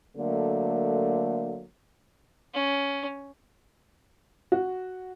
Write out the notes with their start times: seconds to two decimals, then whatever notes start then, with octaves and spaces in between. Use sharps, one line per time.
0.17 D3 F#3 A3 A#3
2.54 C#4
4.52 F#4